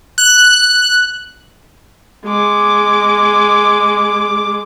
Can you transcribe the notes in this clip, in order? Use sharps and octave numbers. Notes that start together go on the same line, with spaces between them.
F#6
G#3 D6